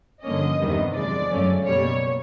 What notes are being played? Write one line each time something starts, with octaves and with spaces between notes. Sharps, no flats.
G2 D3 F3 A#3 C#4 D#5
E2 C3 D#3 G3 B3
F#2 D3 F3 G#3 D5
F#2 C#3 F#3 A3 C#4
B2 G3 A#3 C#5